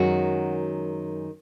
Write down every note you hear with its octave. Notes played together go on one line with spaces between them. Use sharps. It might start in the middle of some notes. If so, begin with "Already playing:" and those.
Already playing: F#2 D#3 G#3 F#4